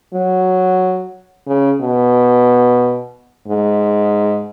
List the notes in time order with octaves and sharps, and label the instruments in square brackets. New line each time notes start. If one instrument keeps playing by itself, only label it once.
[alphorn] F#3
C#3
B2
G#2